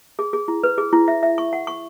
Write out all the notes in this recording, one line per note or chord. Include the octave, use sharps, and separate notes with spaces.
G#4
G#4
E4
B4
G#4
E4
E5
E5
C#6
F#5
C#6